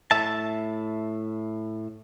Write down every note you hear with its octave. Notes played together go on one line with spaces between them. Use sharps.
A2 E5 A5